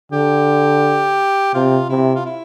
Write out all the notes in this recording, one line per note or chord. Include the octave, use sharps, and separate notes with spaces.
D3 G4
C3 F4
C3 E4
F4
E4